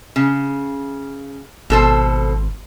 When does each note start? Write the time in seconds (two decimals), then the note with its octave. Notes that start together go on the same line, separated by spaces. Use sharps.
0.16 C#3
1.70 G#1 B2 A4 C5